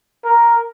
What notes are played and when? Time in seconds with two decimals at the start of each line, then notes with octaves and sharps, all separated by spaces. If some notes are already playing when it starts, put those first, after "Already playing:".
0.24 A#4